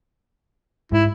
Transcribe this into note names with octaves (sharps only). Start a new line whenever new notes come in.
G#2 E4